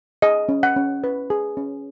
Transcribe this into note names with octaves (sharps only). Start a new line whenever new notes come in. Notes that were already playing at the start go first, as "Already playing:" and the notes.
G#4 D#5
C#4
F#5
C#4
B4
G#4
C#4